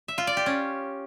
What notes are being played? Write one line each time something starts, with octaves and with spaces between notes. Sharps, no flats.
E5
F4
D5
G4
C#4